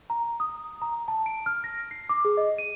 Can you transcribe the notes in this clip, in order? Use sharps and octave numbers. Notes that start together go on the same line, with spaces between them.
A#5
D#6
A#5
A5
D7
F6
A#6
C7
D6
G#4
D#5
D#7